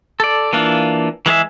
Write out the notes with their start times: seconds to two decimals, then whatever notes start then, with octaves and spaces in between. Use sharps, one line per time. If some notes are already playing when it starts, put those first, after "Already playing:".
0.20 A4 D5
0.53 E3 A#3 D4 F4
1.26 E3 G#3 G#4 E5